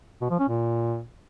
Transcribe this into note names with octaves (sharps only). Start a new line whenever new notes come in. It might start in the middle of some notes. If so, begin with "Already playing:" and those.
B2
F3
C#4
A#2